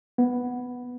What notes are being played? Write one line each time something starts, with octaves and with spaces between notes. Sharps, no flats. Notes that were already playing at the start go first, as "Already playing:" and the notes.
B3